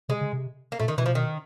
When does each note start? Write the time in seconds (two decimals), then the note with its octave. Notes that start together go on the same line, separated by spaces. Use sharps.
0.09 C3 G#3
0.21 C#3
0.33 C3
0.72 A#3
0.79 A#2 A3
0.88 D#3
0.98 B2 E3
1.06 F3
1.15 D#3